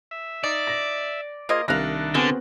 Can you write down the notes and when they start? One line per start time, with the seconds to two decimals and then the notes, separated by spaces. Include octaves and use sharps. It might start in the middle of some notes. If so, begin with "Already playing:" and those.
0.11 E5
0.44 D#4 D5
0.67 A#6
1.49 A#3 F4 G#4 C5 D#5
1.68 C2 D#3 A3 D4 F5 F#6 A#6
2.14 D3 B3 C4 F#4 G#4 A#4